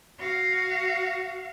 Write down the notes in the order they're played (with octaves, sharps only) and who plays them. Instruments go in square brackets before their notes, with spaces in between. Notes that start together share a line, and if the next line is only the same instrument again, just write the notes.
[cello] F#4 F5